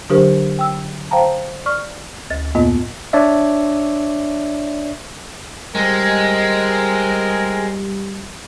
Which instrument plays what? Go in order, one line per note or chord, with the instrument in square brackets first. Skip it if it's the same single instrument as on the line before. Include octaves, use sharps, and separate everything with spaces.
[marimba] D3 F#3 D4 G4 A#4 C5
G5 E6
C5 F5 G5 A5 A#5
D5 C#6 F6
D2 A6
F2 A#2 A#3 B3 F4 D#5
[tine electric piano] D4 C#5 D5 E5
[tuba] G3 [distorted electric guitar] G#3 [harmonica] C4 A#4